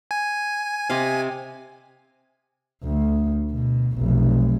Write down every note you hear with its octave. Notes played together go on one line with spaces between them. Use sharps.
G#5
C3 D#5 F5
D2
B2
F1 B1